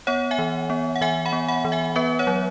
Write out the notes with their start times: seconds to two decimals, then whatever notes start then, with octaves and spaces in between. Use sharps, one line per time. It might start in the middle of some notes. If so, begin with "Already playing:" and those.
0.07 B3 C#5 F#5
0.31 E5 G#5
0.39 E3
0.70 B3
0.96 F#5
1.01 E3 E5 G#5
1.26 F#5 B5
1.33 B3
1.48 F#5 B5
1.65 E3
1.72 E5 G#5
1.96 B3 B4 E5
2.19 C#5 F#5
2.27 F#3